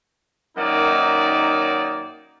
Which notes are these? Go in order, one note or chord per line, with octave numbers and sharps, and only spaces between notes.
F#2 D#3 F#3 A#3 D#4 D5